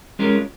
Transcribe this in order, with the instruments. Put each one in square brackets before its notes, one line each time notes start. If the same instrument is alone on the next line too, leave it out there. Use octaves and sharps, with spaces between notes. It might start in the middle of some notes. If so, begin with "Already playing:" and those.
[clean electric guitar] G#3 C#4 F4 A#4